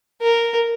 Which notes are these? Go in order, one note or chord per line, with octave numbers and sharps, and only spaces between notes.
A#4